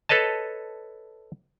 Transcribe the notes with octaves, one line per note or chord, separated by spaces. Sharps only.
A4 B4 C#5 D#5 A5